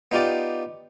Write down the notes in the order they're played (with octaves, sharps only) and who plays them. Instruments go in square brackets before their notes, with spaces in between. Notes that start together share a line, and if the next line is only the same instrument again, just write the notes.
[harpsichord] B3 D#4 F4 G4 D5